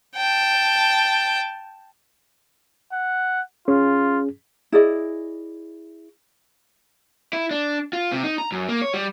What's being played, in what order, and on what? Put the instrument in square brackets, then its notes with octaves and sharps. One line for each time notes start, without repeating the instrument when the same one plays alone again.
[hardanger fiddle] G5 A5
[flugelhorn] F#5
[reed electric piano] C#4 G#4 [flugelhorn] F4
[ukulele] E4 G#4 D5 D#5
[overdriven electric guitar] E4
D4
F4
C3
D#4
A#5
F#2
A#3
C#5
G3